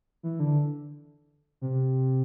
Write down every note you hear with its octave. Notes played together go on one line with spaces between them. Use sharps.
E3
D3
C3